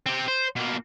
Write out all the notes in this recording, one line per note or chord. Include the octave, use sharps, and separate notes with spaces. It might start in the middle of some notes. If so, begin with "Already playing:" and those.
C4 G4
C5
B2 A#3